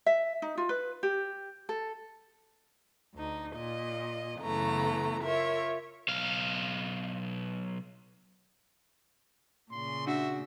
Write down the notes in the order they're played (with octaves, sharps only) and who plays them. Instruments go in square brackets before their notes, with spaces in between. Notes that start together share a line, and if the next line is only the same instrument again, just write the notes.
[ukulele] E5
D#4
F4
B4
G4
A4
[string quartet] D2 D#4
A#2 D#5
F#2 C#3 E3 A3 B3 A#5
F4 A#4 C#5 E5
[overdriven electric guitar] B1 F5
[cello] A#2 C#3 [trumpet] C6
[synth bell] D4 F#5 E6 [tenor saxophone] F#4 [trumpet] E5